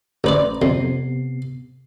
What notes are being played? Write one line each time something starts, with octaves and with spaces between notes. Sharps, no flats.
A1 B4 D5 A#5 C6 G6
F2 C3 B3 C7